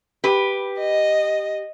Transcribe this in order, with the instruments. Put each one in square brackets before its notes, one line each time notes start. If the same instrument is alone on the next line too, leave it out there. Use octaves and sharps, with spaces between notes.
[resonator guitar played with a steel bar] G4 B4
[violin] D#5